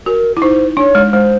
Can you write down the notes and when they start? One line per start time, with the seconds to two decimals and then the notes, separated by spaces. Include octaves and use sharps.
0.06 F#4 A#4
0.37 E4
0.41 D#4 C5
0.77 D4 C#5
0.95 G#3
1.12 G#3 C5